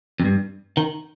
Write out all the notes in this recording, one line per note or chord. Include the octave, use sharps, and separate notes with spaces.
F2
G2
D#3